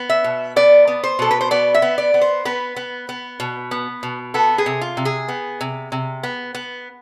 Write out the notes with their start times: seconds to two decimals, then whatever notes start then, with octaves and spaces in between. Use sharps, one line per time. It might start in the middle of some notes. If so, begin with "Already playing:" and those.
Already playing: B3
0.09 E5
0.24 B2
0.56 B3 D5
0.87 B3
1.04 C5
1.19 B2 A4
1.31 B4
1.41 C5
1.51 B3 D5
1.74 E5
1.82 B3
1.98 D5
2.14 B3
2.21 C5
2.45 B3 B4
2.76 B3
3.09 B3
3.40 B2
3.71 B3
4.03 B2
4.34 B3 A4
4.58 G#4
4.66 C3
4.81 F4
4.97 C3
5.05 G#4
5.28 B3
5.61 C3
5.92 C3
6.23 B3
6.55 B3